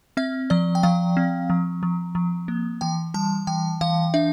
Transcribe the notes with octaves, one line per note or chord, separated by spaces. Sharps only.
C4 E5
F3 D5
G5
F3 F5
C4
F3
F3
F3
A#3
E3 G5
G3 A5
E3 G5
E3 F5
D4 E5